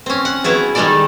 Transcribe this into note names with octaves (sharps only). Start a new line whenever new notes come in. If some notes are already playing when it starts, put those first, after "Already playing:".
C4 C#4
F#5
F#3 B3 E4 G#4
D#3 G3 G#3 D#4 A4 D5